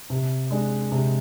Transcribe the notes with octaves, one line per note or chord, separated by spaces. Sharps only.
C3
G#3 D4
C3